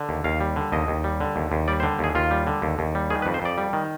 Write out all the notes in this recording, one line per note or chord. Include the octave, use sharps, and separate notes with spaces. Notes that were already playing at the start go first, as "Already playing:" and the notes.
Already playing: D3
D#2
D#2 F5
G3
D3
D#2 D#5
D#2
G3
D3
D#2
D#2
G3 D5
C5
D3
D#2 G#4
D#2 F4
G3
D3
D#2
D#2
G3
D#3 G#4
B4
F2
C5
F2 D5
G3
D#3